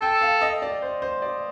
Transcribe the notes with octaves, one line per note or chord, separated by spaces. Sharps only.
A4 G5
F5
D#5
D5
C5
C5
D5